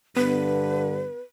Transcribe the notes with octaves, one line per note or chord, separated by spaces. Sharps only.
G2 D3 B3 B4